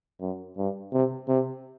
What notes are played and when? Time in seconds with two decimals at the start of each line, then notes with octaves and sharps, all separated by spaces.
0.21 F#2
0.57 G2
0.93 C3
1.28 C3